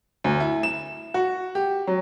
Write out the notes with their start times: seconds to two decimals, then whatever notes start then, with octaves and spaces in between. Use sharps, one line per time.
0.24 D2
0.40 E4
0.63 E7
1.14 F#4
1.55 G4
1.87 F#3